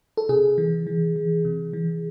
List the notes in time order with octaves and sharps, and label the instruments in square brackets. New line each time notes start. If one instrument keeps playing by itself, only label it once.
[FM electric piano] A4
C3 G#4
E3
E3
E3
C3
E3